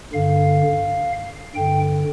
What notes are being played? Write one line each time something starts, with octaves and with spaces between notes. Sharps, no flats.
G2 D3 F5
G2 D3 G5